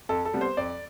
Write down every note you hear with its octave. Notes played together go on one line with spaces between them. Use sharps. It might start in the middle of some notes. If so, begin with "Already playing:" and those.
F2 A4
A4
C3 G3 B3
C5
F2 D5